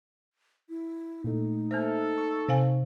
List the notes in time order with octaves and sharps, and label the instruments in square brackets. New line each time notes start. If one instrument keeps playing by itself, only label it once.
[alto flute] E4
[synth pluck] A#2 A3 [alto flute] D#4
[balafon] A#3 C5 [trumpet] A4 [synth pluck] E5 F6
[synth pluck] C#6
[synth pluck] C3 [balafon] C5 F5 G#5